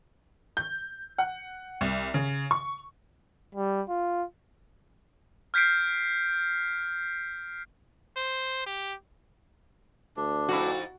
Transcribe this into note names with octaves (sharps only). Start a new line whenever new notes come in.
G6
F#5
C2
C#3
C#6
G3
F4
F6 G6 B6 C7 D7
C5
G4
D2 D4
F2 D#4 E4 F#4